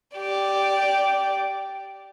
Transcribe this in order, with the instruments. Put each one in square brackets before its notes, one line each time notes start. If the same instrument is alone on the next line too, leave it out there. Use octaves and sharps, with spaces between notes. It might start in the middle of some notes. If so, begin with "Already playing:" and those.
[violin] G4 D5